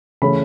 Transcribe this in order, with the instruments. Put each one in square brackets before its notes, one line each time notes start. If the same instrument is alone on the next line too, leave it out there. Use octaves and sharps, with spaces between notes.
[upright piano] C#3 E3 A3 C#4 B5